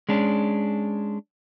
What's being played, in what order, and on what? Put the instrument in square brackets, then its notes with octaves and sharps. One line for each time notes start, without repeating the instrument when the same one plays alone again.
[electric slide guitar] G#3 C#4 D4